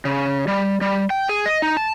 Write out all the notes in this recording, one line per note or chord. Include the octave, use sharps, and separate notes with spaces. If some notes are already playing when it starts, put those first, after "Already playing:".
C#3
G3
G3
G5
G#4
D#5
D#4
A5